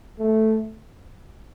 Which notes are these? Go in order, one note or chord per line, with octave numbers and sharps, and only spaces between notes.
A3